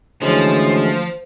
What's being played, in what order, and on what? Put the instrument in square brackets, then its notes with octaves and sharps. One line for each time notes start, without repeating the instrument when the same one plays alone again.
[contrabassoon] D2 [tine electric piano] E3 G#3 C#4 [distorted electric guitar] F3 [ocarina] C5